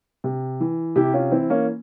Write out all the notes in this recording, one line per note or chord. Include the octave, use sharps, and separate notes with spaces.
C3
E3
C3 E4 G4
C#4 F4
E3 C4 E4
A#3 C#4